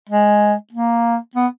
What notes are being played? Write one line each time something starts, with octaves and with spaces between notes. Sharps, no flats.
G#3
A#3
B3